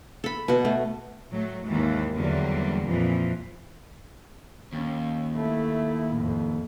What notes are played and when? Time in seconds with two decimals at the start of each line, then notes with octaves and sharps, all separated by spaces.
0.24 A4 B5
0.48 B2 F#4
0.65 A3
1.31 A2 F#3 A3
1.65 D#2 G#2 E3
2.15 E2 D3 F#3 G3 A#3
2.89 F2 A#2 E3 F3
4.73 D#2 C#4
5.36 A3 E4
6.12 F2 A2